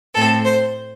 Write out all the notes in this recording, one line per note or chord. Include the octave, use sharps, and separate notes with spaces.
A2 A3 C4 A4
C5